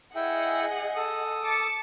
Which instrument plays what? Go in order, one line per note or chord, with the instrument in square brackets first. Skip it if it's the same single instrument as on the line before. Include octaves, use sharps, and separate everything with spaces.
[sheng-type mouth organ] E4 E5 G5 [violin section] G#4 D#5 F#5
[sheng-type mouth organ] A4 D#6
[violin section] A5 D6 C#7